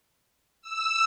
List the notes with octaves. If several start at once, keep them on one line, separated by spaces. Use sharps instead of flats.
E6